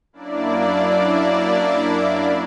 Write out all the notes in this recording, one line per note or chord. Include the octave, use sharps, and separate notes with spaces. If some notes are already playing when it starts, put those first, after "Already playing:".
F#2 A#3 D4 E4 D5